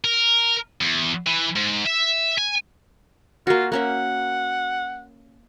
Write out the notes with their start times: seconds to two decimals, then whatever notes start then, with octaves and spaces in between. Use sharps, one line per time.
0.04 A#4
0.81 E2
1.27 E3
1.56 G#2
1.86 E5
2.38 G#5
3.47 A#3 F4 F#4
3.72 A#3 C#4 E5 F#5